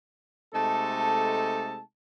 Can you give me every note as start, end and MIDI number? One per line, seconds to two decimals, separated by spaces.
0.54 1.80 48
0.54 1.80 56
0.54 1.80 57
0.54 1.80 63
0.54 1.80 69
0.54 1.80 81